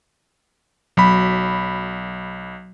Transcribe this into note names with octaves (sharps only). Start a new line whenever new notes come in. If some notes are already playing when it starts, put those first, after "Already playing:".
B1 F#3 B5